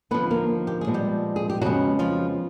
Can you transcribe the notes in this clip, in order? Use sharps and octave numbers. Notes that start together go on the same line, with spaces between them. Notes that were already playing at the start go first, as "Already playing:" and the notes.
D#2 D3 F3 B3 B4
A#3 A#4
G4
G#4
A#2 F3 G#3 B3
G3 G4
G#4
G4
F2 C#3 F3 F#3 G#3 B3 F#4
F3 F4